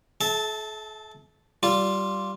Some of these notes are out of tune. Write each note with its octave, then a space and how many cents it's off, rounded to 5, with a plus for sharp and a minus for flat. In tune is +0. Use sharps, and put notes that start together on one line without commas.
A4 -45 E5 -30 A5 +0
G3 -15 F4 +0